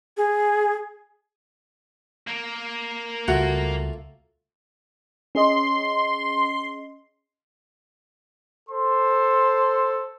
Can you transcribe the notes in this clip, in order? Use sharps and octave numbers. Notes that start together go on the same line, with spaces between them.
G#4
A#3
C#2 C#3 G3 A3 F4 F#4
C#4 G#4 D#5 C6
A4 C5 C6